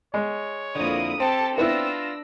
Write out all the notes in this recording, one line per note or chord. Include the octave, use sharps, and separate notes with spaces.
G#3 C#5
F2 D3 A#3 E4 D#6
C4 G4 A4 A5
B3 D4 E4 F4 E6 A#6